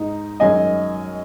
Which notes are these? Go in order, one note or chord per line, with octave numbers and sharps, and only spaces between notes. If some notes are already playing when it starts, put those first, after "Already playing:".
Already playing: G#2 D#4
F#2 D#3 G#3 C#4 D#5 G#5